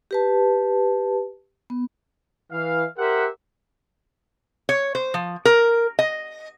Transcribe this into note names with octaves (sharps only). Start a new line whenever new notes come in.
G4 B4 A5
B3
E3 F5
G4 A#4 C5 E5 F#5
C#5
C5
F3
A#4
D#5